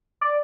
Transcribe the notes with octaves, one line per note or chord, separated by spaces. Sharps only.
D5